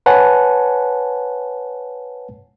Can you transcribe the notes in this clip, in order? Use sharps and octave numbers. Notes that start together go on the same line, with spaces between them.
B4 C#5 F#5 G#5 A5